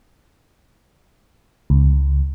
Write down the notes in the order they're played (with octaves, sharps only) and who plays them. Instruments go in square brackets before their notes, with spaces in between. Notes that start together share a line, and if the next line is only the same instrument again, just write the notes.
[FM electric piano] C#2